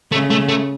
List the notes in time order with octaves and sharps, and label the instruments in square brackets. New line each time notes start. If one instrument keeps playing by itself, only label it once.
[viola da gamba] C#3 [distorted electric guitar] A3
[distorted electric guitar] A3
A3